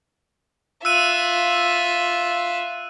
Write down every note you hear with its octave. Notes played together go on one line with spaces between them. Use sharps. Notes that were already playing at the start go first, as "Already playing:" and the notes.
F4 E5 E6 F#6 D#7